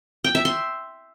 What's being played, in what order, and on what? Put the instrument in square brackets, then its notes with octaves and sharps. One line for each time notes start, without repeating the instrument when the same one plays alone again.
[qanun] G5
E5
C6